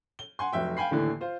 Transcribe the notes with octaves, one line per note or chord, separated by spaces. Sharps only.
G7
F#5 G#5 C6
F1 F#3 E5 G5
F5 G5 G#5 B5 C7
D#2 A2 D3 E3
F4 C5